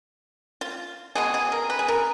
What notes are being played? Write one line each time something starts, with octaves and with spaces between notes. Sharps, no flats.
F4
B2 G#3 B3 G#4
G#4
A#4
B4
G#4
A#4